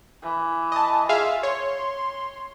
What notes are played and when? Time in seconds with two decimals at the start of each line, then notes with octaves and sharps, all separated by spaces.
0.23 E3
0.72 D#5 A5
1.09 F4 G#4 E5 F5
1.43 C#5 C6